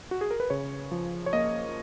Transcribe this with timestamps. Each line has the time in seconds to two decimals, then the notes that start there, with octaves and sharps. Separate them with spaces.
0.11 F#4
0.21 G#4
0.31 A#4
0.40 B4
0.50 C#3 C#5
0.92 F3
1.26 C#5
1.33 A#3 D#5